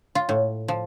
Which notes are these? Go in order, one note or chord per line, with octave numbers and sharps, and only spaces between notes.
F4
A2
F3